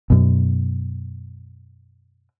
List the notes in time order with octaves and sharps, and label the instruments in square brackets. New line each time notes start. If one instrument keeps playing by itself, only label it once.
[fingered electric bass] F#2 B2